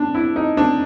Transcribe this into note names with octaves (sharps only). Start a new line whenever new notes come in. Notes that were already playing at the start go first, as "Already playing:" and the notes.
Already playing: D4
E4
D#4
D4